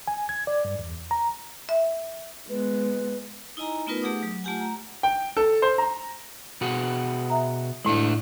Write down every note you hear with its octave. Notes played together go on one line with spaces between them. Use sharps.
G#5
G#6
D5
G2
E2
A#5
E5
G#3 B3 B4
D#4 E4 D#5 G#5 A#5
A3 B3 D#4 F4 A#4 B4
A3 G4 G#4 F#5 D6 D#6
F#3
A3 F4 G4 F#5 G#5
A#5
G5
A4
C5
A#5
B2 F#4 G#4
E5 A#5
A2 G#3 A3 D4 E4